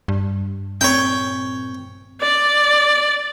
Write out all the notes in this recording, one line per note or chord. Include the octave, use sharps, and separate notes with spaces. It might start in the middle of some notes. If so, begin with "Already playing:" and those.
G2
A#2 C4 C#5 G5 B5
D5